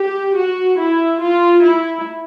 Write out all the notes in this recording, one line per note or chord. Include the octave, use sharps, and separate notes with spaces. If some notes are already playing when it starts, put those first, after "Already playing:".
Already playing: G4
F#4
E4
F4
E4